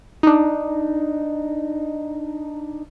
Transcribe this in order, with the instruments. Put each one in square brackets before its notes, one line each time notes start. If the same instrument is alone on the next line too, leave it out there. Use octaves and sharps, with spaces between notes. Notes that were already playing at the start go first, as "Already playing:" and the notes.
[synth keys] D4 D#4